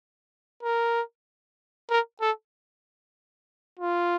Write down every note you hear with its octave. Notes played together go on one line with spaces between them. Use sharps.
A#4
A#4
A4
F4